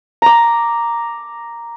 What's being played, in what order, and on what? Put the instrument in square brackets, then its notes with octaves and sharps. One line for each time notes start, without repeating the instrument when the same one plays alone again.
[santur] A#5 D6